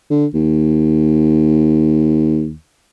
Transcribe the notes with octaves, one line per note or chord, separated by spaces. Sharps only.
D3
D#2